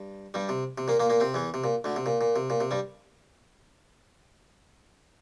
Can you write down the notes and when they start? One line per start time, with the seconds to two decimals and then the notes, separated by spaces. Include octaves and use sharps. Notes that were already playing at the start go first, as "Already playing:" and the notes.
Already playing: G2
0.34 G2 G3
0.49 C3
0.78 C3
0.88 A#2 A#3
1.00 A#2 A#3
1.10 A#2 A#3
1.20 C3 C4
1.34 E2 E3
1.54 C3
1.64 A#2
1.84 D2 D3
1.96 C3
2.06 A#2
2.21 A#2
2.36 C3
2.50 A#2
2.60 C3
2.71 G2 G3